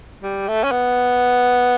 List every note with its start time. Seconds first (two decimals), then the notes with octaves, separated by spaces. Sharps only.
0.23 G3
0.48 A3
0.64 C#4
0.71 B3